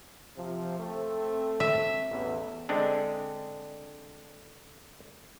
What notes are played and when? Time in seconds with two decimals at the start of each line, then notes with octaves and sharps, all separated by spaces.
0.37 C3 F3
0.79 A3 C4
1.60 E5
2.11 A1 E2 B3
2.69 D3 G#3 C4 D4